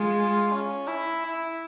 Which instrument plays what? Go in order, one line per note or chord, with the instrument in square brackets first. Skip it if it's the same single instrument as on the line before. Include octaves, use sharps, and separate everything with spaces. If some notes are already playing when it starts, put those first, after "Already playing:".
Already playing: [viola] G#3 [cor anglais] F4
[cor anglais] C#4
E4
E4